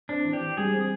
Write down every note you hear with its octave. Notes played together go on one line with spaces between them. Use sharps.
C4 D4
E3
G4
E3
G3 G#4
C4